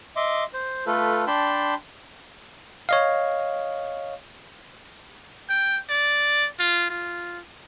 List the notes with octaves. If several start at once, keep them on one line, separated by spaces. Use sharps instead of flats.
D#5 E5 C6 D6
C5
A3 F4 A4 B4
D4 G5 A5 B5 C6
C#5 D#5 F5
G5
D5
F4
F4